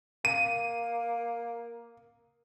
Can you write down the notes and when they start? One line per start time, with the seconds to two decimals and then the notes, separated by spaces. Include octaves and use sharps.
0.25 A#3 D#7